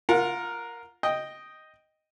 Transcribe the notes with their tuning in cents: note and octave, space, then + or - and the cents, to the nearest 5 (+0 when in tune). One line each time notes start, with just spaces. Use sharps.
F4 +0 A#4 +0 F#5 -35
D#5 +0 G5 +0